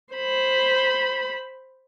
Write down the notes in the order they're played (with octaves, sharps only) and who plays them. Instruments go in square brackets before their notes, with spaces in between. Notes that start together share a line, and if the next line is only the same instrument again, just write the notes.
[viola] C5 B5